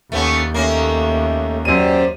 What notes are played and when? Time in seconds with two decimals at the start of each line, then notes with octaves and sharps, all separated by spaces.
0.12 D#2 A3 B3 C#4
0.54 A3 A#3 C#4
1.65 F#2 G4 C5 D5 D#7